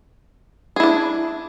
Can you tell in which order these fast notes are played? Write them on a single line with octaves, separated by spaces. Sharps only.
G#4 E4 D4